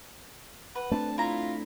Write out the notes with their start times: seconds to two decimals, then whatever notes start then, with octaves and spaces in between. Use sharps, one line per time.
0.75 B4 F#5
0.92 A3 C4 D4 A5
1.18 E4 F4 A#5